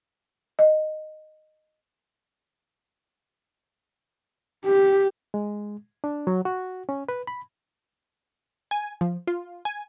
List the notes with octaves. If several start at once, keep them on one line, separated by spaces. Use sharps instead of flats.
D#5
G4
G#3
D4
F#3
F#4
C#4
B4
B5
G#5
F3
F4
G#5